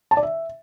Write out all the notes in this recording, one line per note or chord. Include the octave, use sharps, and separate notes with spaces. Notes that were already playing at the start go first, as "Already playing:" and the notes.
A5
D5
E5